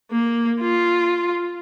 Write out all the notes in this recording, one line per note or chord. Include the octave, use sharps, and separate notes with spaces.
A#3
F4